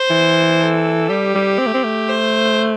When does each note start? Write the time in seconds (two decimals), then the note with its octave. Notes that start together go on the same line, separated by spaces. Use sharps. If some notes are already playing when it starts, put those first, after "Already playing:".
Already playing: C5
0.10 E3
0.59 A4
1.09 G3 G4
1.34 G3
1.59 C4
1.67 A3
1.74 C4
1.84 A3
2.09 C5